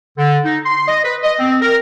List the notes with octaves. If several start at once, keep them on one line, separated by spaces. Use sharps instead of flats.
D3
D#4
C6
D#5
B4
D#5
C4
A#4